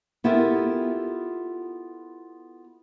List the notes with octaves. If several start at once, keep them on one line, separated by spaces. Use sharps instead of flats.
B3 E4 F4 G4 A4 A#4